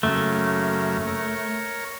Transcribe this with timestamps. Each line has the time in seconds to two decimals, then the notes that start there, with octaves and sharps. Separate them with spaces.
0.03 F#2 C#3 A3 A#3
1.07 A#4 C#5